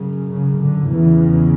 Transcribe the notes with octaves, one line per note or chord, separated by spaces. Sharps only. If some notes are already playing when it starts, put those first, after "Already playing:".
Already playing: F#2 C#3
C#3
D3
E2 C#3 E3